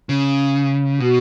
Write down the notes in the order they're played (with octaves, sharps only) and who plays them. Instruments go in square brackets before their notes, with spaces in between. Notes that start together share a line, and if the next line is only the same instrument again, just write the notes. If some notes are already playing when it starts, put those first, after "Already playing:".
[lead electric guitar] C#3
[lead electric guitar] B2 [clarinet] F#4